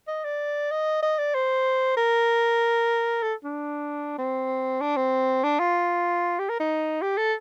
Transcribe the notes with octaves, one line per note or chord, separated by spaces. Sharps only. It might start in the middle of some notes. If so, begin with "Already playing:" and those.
D#5
D5
D#5
D#5
D5
C5
A#4
A4
D4
C4
D4
C4
D4
F4
G4
A#4
D#4
G4
A4